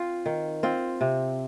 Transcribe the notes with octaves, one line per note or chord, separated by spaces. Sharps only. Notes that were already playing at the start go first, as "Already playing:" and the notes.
Already playing: C4 F4
D#3
C4 F4
C3